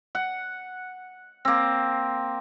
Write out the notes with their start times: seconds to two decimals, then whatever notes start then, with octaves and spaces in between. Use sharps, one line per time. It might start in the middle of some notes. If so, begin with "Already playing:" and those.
0.15 F#5
1.45 A#3 C4